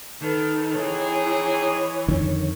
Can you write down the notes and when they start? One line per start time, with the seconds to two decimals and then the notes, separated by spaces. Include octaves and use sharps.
0.21 D#3 A4 B4
0.76 E3 C4 D#4 G#4 C#5
2.08 F2 D3 D#3